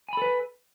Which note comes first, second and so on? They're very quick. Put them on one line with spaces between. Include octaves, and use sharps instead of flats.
G#5 B5 A4 B4